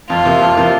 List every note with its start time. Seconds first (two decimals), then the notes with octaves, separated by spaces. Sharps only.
0.09 F2 F4
0.25 C3 F3 A#3
0.41 F2
0.57 C3 F3 A#3